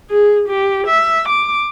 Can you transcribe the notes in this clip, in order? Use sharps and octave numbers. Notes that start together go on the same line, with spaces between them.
G#4
G4
E5
D6